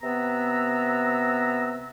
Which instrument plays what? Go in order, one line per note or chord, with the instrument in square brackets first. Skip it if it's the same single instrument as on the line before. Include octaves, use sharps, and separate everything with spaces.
[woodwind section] C3 B3 B4 A#5 E6